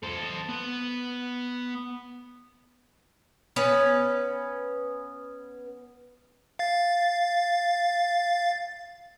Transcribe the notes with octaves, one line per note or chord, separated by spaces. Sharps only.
A4 C5
B3
B3 C#4 B4
F5 A6